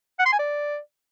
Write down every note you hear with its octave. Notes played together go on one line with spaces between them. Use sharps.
F#5
C6
G#5
D5